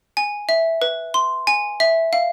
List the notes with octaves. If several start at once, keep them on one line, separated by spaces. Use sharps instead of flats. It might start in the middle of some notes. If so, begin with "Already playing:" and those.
G#5
E5
B4
C6
G#5
E5
F5